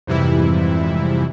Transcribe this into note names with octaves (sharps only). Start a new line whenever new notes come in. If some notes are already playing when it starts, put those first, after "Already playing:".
F2 G#2 C3 E3 G3 E4